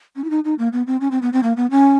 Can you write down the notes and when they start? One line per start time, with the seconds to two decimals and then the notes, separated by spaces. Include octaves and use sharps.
0.16 C#4
0.24 E4
0.30 D#4
0.45 D#4
0.59 A#3
0.73 B3
0.87 C4
1.01 C#4
1.11 C4
1.22 B3
1.33 C4
1.43 A#3
1.57 B3
1.71 C#4